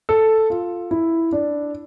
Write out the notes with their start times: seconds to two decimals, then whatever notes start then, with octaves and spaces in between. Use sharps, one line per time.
0.09 A4
0.50 F4
0.91 E4
1.32 D4